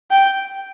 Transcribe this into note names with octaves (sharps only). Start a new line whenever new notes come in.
G5